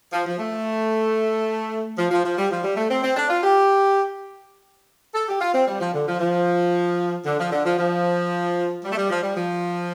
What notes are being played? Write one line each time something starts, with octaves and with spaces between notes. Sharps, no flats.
F3
F3
A3
F3
F3
F3
G3
F3
G3
A3
C4
C4
D4
F4
G4
A4
G4
F4
C4
G3
F3
D3
F3
F3
D3
F3
D3
F3
F3
G3
A3
G3
F3
G3
F3